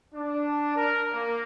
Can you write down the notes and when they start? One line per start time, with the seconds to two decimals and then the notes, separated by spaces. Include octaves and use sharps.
0.15 D4
0.76 A#4
1.13 A#3